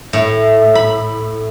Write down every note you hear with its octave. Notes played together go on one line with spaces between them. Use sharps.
A2
B5